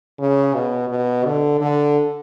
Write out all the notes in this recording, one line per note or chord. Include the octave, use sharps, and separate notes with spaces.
C#3
B2
B2
D3
D3